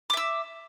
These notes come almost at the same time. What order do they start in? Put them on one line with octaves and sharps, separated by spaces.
D6 E5 E6